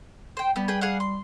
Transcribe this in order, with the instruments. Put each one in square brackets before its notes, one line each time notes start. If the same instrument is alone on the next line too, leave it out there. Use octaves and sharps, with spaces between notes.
[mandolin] C5 G5
[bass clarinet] G3 [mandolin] B3 G4
[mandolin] G#4 B4 G5
G#4 F5 F#5
C6